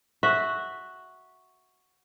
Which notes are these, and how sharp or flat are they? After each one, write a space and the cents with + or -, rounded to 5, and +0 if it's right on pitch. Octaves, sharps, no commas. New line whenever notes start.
F#4 +0 E5 -10